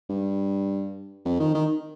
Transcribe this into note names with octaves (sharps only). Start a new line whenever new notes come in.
G2
F2
D#3
D#3